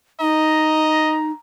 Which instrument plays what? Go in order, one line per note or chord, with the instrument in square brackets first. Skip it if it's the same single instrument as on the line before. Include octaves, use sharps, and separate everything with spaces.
[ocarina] D#4 [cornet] D#5 [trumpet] A#5